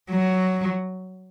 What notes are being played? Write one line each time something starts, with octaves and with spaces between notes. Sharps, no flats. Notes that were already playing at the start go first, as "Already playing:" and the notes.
F#3